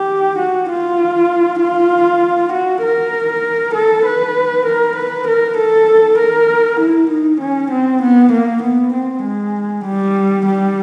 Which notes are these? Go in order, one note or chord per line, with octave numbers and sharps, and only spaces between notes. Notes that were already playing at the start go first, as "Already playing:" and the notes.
Already playing: G4
F#4
F4
F4
F#4
A#4
A4
B4
A#4
B4
A#4
A4
A#4
E4
D#4
C#4
C4
B3
A#3
B3
C4
G#3
G3
G3